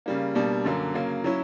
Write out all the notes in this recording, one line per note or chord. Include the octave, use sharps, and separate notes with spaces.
C#3 G3 A#3
B2 G3 A#3 D4
F#2 D3 F#3 A#3
C#3 F#3 A#3
F#3 C#4 E4